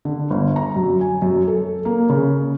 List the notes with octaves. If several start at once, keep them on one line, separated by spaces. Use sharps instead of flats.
D3
G1
A#5
F#2
G#5
F#2
A4
A#3
C#3